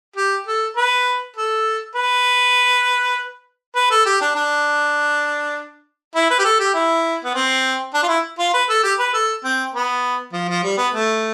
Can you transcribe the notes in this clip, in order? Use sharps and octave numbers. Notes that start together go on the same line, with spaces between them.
G4
A4
B4
A4
B4
B4
A4
G4
D4
D4
E4
B4
G4
A4
G4
E4
B3
C4
D4
F4
E4
F4
B4
A4
G4
B4
A4
C4
B3
F3
F3
G3
B3
A3